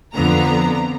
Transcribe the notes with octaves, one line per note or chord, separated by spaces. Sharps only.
F2 D3 F3 B3 A#5